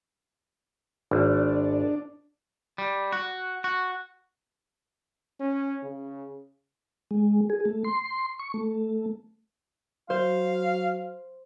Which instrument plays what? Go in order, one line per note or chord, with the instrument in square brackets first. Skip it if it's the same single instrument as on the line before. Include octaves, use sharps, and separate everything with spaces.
[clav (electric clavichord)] G#1 [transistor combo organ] D4
[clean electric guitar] G3
F#4
F#4
[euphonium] C#4
C#3
[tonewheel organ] G#3
G#4
A3
C6
C#6
A3
[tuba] F#3 [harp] C5 [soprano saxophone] F5